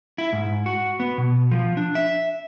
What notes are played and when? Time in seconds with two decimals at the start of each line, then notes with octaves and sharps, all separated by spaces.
0.18 E4
0.33 G#2
0.66 F#4
1.00 B3
1.18 B2
1.52 F3
1.77 D4
1.95 E5